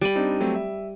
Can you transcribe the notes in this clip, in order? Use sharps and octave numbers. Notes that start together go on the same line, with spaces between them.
G3 B5 D7 D#7
C4 D4 D#4
F#3 A3 C4
E5